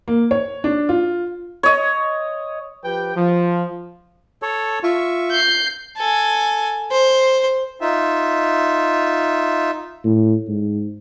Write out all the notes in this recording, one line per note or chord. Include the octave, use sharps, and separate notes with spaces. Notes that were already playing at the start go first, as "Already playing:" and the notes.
A#3
C#5
D4
F4
C#5 D#5
F3 G4 B4 G5
F3
A4 C#5
F4 E5 C#6
G6 C7
A4 G#5
C5
D#4 F4 E5
A2
G#2